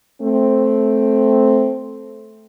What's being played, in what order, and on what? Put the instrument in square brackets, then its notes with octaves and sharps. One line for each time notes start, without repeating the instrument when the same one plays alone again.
[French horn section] A3 C4